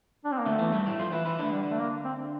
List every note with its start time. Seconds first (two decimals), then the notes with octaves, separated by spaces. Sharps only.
0.24 D4
0.32 C4
0.39 A#3
0.46 D2 D3 A3
0.59 E2 E3
0.72 G2 G3
0.86 A2 A3
0.99 F3 F4
1.12 E3 E4
1.25 E3 E4
1.39 D3 A3 D4
1.52 G3
1.70 A3
1.79 A#3
2.04 C4